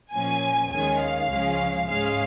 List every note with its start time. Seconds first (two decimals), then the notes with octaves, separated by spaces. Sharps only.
0.13 A#2 F3 C#4 G#5
0.71 D#2 D#3 G#3 C#4 G#5
1.00 F5
1.29 C#2 C#3 F3 G#3 C#4
1.88 G#2 G#3 C#4 F5